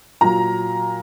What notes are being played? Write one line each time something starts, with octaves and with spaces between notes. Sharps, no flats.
A#2 F#3 A#5